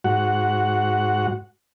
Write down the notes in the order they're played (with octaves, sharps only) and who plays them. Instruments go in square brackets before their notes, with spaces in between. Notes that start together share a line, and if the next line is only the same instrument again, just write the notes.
[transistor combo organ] G#2 F#4 F#5